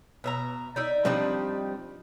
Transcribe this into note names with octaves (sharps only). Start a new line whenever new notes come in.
B2 E5 A#5
D#4 D5 E5
F3 G3 C4 D4 D#4 G4